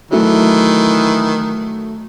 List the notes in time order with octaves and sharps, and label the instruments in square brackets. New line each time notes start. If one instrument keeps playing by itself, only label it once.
[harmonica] D#3 E3 [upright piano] F#3 A3